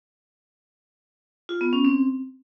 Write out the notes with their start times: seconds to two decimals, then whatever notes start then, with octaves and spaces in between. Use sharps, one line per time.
1.49 F4
1.61 B3
1.73 C#4
1.85 C4